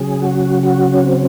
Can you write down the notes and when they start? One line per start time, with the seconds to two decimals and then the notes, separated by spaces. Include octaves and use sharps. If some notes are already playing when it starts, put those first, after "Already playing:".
Already playing: C#3 F#3 G#4
0.22 F#4
0.63 F#4
0.94 C#4
1.04 C4